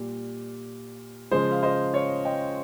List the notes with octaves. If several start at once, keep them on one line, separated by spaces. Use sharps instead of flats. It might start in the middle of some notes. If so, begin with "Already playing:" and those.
Already playing: A#2 G3
C#3 F3 G#3 G#4 C5
F5
C5 D#5
C#5 F5
D#5 G5